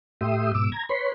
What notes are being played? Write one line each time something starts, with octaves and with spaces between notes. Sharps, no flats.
A2 A3 G4 E5 C6 D#6
G#2 B2 D6 E6
A#5 G#6
B4 C#5 B5 C6